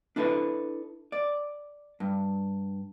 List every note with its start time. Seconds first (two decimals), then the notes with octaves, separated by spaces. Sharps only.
0.16 D4 E4 A4 B4
1.12 D5
2.00 G2